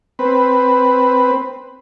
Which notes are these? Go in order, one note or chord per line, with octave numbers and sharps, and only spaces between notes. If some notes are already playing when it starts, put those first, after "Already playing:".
C4 B4